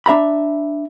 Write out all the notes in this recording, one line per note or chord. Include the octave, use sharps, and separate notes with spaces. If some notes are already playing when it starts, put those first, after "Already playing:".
D4 E5 A#5 B5